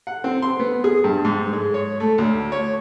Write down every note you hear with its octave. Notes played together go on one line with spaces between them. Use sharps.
F#5
C4
C6
B3
G#4
G2
G#2
G#3
C#5
A3
D2
C#5